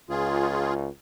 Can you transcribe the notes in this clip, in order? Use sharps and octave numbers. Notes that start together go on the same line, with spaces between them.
C#2 F4 G#4